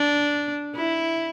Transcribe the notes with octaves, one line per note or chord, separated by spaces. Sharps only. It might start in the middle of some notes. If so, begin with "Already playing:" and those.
Already playing: D4
E4